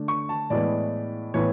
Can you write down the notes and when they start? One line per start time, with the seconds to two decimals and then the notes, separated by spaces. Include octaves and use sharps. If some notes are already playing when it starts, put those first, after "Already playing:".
Already playing: D3 A3 D4
0.08 C#6
0.29 A5
0.50 A2 E3 G#3 B3 D5
1.34 A2 E3 B3 E4 C#5